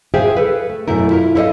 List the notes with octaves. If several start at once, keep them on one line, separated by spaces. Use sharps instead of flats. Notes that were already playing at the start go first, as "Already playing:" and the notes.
G#4 C5 E5 F5 G5
A4 B4
A3
F#2 B2 A3 E4 A#4
E4 F4 A#4
E4 A4 C#5 D#5 F5